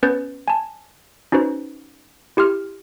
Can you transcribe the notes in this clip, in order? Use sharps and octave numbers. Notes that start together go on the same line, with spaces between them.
B3 C#4 B4 G6 A6
G#5 A5
C#4 D#4 F#4 B4 C5
E4 G4 C6 F6